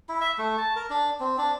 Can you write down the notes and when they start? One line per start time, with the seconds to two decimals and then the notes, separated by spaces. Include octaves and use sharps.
0.09 E4
0.21 E5
0.38 A3
0.58 A5
0.76 A#4
0.90 D4
1.20 C4
1.38 D4